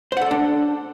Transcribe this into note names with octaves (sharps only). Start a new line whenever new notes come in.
D4 A4 C5 D5 F#5